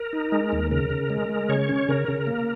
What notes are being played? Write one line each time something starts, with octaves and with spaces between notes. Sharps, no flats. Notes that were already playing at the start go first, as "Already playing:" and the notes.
Already playing: A#4
D#4
G#3
D#2
C#3 A#4
C#3
G#3
G#3
C#3 C#5
C#4
C#3 A#4
C#3
A#3